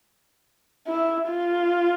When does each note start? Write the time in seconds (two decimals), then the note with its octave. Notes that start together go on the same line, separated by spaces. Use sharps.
0.88 E4
1.30 F4